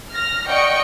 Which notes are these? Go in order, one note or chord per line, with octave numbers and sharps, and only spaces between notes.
F6 A#6
D5 D#5 F#5 G5 C#6 C#7